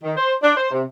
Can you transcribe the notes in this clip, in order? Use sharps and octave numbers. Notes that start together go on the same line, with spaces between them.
D#3
C5
D4
C5
C3